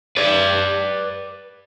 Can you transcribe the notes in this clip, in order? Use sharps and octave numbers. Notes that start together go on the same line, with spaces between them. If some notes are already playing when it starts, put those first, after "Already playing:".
B4 D5